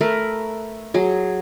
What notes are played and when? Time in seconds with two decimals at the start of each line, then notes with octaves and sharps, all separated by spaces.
0.01 A3 A#4 B4
0.94 F#3 G#4